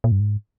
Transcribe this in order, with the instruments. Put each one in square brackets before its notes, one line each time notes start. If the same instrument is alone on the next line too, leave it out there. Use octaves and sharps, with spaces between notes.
[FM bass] A#2
G2
G#2